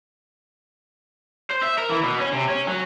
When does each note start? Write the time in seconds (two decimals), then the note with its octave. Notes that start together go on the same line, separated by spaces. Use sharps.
1.51 C5
1.63 E5
1.78 A#4
1.90 E3
2.03 B2
2.19 C#4
2.33 C3
2.49 C#4
2.68 F#3